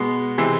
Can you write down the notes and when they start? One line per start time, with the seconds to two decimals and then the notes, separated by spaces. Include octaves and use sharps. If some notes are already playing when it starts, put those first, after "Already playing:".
Already playing: B2 G#3 B3
0.38 C3 E3 G#3 C4